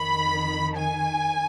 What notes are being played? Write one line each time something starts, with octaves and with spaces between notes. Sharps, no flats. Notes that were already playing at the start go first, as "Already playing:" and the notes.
Already playing: F2 D#3 B5
G#5